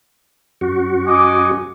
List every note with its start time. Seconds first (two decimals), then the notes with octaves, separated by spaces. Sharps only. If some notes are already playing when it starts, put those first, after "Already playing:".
0.61 F#2 F#4
1.06 D#5 G#5 D6